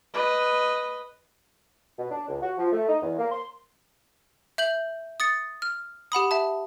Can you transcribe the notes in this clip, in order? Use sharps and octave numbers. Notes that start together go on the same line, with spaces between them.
B4 D#5
B2
D4
C#2
F#4
F3
A3
D#4
E2
A#3
C6
E5 G6 F#7
D#6 A6 C#7
F6
G4 F#5 B5 D#6
E5 A5